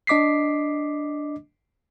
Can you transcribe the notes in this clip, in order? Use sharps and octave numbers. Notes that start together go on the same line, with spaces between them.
D4 D#5 D6 B6 C7